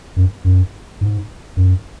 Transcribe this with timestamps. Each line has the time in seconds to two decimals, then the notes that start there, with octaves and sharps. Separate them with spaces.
0.16 F#2
0.45 F#2
1.01 G#2
1.57 F#2